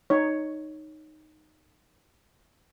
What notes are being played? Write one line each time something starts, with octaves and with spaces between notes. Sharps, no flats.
D#4 C#5